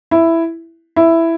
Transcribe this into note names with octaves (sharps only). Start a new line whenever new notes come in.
E4
E4